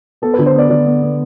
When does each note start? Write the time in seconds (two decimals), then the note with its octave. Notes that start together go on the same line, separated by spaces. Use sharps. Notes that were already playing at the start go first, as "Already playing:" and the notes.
0.22 B3 A4
0.34 D3 B4
0.46 C5
0.55 B3 D5
0.69 D3 D5
0.86 B3
1.02 B3